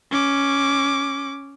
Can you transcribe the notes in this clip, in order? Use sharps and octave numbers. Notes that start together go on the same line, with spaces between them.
C#4 D6